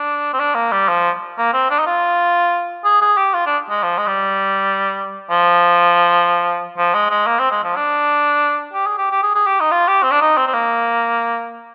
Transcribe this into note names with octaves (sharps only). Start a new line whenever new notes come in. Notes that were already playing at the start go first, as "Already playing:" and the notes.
Already playing: D4
C4
D4
A#3
G3
F3
A#3
C4
D4
D#4
F4
G#4
G#4
G4
F4
D4
G#3
F3
G#3
G3
F3
F3
G#3
G#3
A#3
C4
G#3
F3
D4
G4
G#4
G4
G4
G#4
G#4
G4
D#4
F4
G4
C4
D4
D#4
C4
C4
A#3